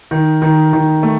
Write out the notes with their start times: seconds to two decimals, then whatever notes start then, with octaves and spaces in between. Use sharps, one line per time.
0.11 D#3
0.42 D#3
0.73 D#3
1.03 A3